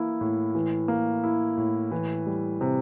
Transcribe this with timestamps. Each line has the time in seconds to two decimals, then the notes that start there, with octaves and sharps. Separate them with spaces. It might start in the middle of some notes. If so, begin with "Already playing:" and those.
Already playing: E3 A#3 E4
0.21 A2
0.55 E3
0.88 A#3
1.24 E4
1.57 A2
1.91 E3
2.26 G3
2.61 C3